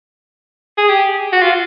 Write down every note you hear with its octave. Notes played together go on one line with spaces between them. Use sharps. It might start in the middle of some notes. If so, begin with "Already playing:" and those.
G#4
G4
F#4
F4